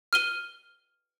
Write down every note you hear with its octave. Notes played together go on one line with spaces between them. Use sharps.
F6 D#7 G7